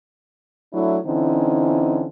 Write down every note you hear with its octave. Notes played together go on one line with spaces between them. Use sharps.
F#3 A3 D4 E4
D3 E3 C4 C#4 D#4 E4